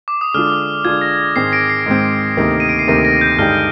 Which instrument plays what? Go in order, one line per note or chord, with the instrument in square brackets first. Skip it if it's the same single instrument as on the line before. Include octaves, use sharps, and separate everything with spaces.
[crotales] D6
D#6
[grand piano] D3 G#3 D4 F4 [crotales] F6
[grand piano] D3 G#3 D4 F4 [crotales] G#6
[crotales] A#6
[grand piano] G#2 D#3 G#3 C4 [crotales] C7
[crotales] A#6 D7
C7
[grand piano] G#2 D#3 G#3 C4
D2 C3 D#3 A#3 D#4
[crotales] D#7
D7
C7
[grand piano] D2 C3 D#3 A#3 D#4 [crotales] A#6
[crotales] A#6
G6
[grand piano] G2 D3 G#3 D#4 G4 [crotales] F6